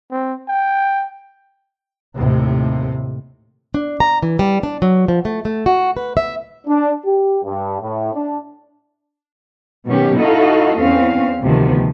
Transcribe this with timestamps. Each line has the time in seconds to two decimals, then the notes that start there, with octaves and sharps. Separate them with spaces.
0.11 C4
0.49 G5
2.17 D#2 A2 C3
3.74 D4
4.00 A#5
4.23 E3
4.39 G3
4.63 D4
4.82 F#3
5.08 F3
5.25 A3
5.45 A3
5.66 F#4
5.97 B4
6.17 E5
6.67 D4
7.04 G4
7.44 G2
7.81 A2
8.14 D4
9.86 B2 D#3 F#3 C#4 G4
10.17 D#4 E4 F#4 A4 D#5 F5
10.77 E2 C4 C#4 F5
11.42 D2 C3 D#3 F3 B3